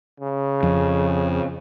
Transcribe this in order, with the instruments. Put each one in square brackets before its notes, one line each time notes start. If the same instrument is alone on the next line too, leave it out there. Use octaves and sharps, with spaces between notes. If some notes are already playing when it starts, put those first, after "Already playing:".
[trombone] C#3
[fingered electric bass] F2